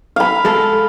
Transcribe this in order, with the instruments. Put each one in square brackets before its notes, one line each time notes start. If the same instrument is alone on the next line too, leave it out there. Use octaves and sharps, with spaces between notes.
[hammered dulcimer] F5 B5
[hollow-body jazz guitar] G#3 A4